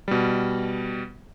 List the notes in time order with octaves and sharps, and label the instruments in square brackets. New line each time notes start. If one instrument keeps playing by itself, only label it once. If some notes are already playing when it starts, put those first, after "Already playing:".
[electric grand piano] B2 G3